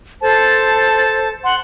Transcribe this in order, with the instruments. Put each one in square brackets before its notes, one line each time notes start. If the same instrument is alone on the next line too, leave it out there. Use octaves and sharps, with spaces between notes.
[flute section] A4 C5 [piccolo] A5
[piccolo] F#5 [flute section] C6